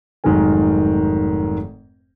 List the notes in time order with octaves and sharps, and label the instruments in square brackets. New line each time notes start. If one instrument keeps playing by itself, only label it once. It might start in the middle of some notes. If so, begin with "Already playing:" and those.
[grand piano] F1 G#2 D#3 F#3 A#4 G#5